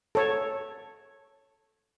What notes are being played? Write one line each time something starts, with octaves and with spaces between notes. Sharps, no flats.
A4 C#5